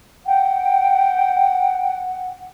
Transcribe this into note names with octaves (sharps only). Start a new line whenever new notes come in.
F#5 G5